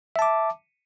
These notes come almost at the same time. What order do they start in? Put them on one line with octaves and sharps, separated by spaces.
E5 A5 D6